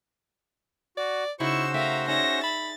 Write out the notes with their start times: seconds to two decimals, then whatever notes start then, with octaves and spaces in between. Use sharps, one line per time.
0.97 F#4 D5
1.40 C#3 D#4 E4 F#4 C5 A5 C#6 E6
1.74 A3 A#4 E5 F5 G5 A#5
2.08 C#4 D#4 G#4 D5 E5 A#6
2.44 B5 A6